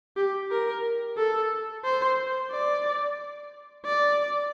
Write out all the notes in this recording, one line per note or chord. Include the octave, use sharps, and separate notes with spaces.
G4
A#4
A4
C5
D5
D5